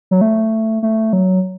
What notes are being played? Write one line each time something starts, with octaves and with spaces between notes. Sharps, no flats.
F#3
A3
A3
F#3